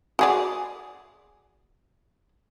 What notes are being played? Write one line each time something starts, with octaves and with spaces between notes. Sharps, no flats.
F#4 G#4 D5